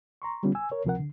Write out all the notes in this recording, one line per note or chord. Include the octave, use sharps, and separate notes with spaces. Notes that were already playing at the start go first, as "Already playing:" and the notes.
A#5 C6 C#6
D3 G3 B3 C#4 F4
G#5 E6
A#4 C#5
D2 C3 F3 C4 A#4 F#5
D3